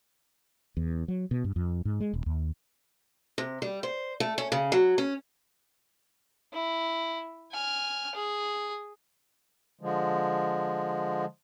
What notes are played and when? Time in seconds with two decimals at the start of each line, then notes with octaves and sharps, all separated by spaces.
0.77 E2
1.08 F#3
1.31 B2
1.44 G2
1.56 F2
1.85 G#2
2.00 G#3
2.14 D#1
2.26 D#2
3.38 C3
3.62 G3
3.83 C5
4.20 A3
4.38 C#4
4.52 C#3
4.72 F#3
4.98 C#4
6.53 E4
7.52 G#5 F6
8.15 G#4
9.81 D3 F3 G#3